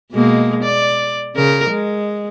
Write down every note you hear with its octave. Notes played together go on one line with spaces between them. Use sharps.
B2 G#3 A#3
D5
C#3 A#4
G#3